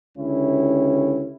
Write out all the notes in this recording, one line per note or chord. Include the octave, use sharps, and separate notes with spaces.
C#2 D3 C#4 E4 G4